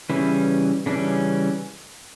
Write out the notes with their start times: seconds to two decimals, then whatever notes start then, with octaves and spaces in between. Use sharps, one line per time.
0.10 C#3 E3 G3 C#4 E4
0.86 C#3 E3 G3 C#4 D4